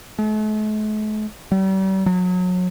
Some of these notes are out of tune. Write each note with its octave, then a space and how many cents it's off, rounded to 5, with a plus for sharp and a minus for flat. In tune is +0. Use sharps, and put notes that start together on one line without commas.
A3 -45
G3 -40
F#3 -30